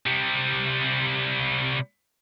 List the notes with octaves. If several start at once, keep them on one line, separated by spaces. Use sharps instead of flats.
C3 G3